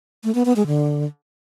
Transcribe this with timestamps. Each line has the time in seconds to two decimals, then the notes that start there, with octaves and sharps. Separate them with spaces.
0.24 A3
0.35 B3
0.45 B3
0.56 G#3
0.67 D3